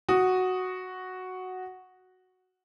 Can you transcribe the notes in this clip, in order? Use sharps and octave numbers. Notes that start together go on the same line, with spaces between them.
F#4 D#6